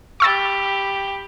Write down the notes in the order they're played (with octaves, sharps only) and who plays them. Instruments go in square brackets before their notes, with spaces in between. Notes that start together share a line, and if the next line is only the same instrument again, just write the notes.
[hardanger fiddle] G4 B5 [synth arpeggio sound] C#6 E6 A6